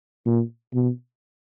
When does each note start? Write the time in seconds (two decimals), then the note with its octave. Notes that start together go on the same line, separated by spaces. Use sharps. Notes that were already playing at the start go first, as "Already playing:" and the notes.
0.26 A#2
0.74 B2